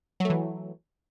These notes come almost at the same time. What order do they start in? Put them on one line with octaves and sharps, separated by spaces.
F#3 A3 E3